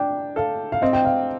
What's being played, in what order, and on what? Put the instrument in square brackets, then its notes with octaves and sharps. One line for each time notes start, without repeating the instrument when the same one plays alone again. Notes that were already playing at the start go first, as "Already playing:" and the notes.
Already playing: [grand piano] D4 [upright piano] G5
[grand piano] A4 [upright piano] F5
[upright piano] F5
[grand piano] C4 [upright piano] D#5
[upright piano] G5
F5